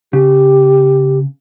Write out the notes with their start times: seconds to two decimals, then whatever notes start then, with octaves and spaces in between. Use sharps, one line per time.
0.13 C#3 G4